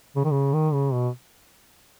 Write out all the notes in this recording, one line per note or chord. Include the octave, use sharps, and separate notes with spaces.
C#3
D#3
C#3
D#3
C#3
B2